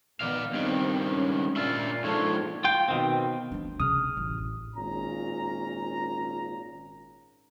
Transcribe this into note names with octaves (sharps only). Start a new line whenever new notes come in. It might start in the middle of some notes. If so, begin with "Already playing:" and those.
A#2 D#3 B3 D5 F5
G2 D#3 C4
G#2 C#4
A#2 D4 F4 E5
G#2 F3 A#3 D4 A4 C#5
F4 G5
B2 D#3 C4
D2 D4
C#3 D#6 F6
A1
G#1 A#2 C#4 A#5